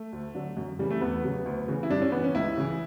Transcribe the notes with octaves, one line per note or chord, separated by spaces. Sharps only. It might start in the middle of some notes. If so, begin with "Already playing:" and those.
Already playing: A3
D2
D3 F#3
F#2
C#3 E3 G3
A3
E2 B3
C#3 F#3
D2
C#3 E3
E4
G2 D4
C#4
E3 B3
C#4
C#2 E4
C#3 E3